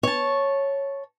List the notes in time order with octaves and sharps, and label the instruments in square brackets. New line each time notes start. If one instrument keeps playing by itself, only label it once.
[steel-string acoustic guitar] C#5 A5